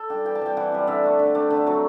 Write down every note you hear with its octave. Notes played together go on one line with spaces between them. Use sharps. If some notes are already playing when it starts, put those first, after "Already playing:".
Already playing: A4
G3 D4 G5
E3 G5
A5
G3 C4 G5
E3 F#5
G3 C4
D3 E5
A3 D4
D3
A3 D4
D3
F#3 A3 C4